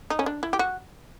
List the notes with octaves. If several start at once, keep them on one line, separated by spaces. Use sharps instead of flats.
D#4
C#4
D4
E4
G4
F#4